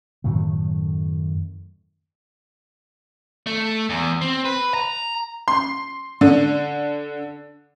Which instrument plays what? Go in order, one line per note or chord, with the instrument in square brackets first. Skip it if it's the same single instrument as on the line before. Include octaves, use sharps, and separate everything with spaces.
[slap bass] F#2 A2 D#3 A3
[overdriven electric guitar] A3
E2
C4
B4
A#5
[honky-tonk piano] C6
D3